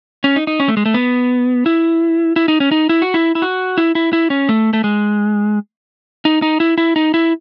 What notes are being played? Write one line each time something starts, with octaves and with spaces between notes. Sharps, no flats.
C#4
D#4
D#4
C#4
A3
G#3
A3
B3
E4
E4
D#4
C#4
D#4
E4
F#4
E4
E4
F#4
E4
E4
E4
C#4
A3
A3
G#3
D#4
D#4
E4
E4
D#4
E4